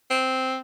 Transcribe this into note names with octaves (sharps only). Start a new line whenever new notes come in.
C4